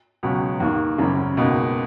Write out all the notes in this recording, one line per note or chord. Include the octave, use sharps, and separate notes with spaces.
C#2 B2 F#3 C#4
D#2 D#3 A#3
G#1 F#2 C#3
C#2 B2 A#3 D#4